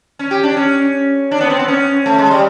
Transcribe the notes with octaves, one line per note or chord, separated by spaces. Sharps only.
C#4
G4
D4
C#4
D4
B3
C4
B3
C#4
A3
G#3
G3